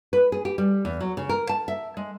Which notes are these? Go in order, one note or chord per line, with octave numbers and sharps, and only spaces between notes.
B4
G#4
G4
G3
E2
F#3
C#3
A#4
A5
E5
G#3